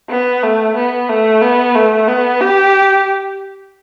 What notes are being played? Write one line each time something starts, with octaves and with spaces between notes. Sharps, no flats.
B3
A3
B3
A3
B3
A3
B3
G4